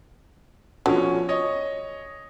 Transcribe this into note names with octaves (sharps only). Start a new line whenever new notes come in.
B2 D3 F3 C#4
C#5 D#5